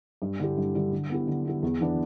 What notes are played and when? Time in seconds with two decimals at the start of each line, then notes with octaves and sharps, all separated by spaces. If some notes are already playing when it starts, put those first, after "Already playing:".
0.22 G2
0.40 D3 G3 E4 G4
0.57 G2
0.75 D3 G3 E4 G4
0.92 D3
1.10 B3 E4 G4
1.28 D3
1.45 B3 E4 G4
1.63 E2
1.81 E3 B3 D4